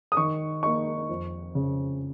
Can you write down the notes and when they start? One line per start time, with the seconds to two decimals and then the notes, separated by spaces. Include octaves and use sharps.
0.12 D#6
0.17 D#3 C#6
0.63 A#3 D#4 C#6
1.09 F2
1.55 C#3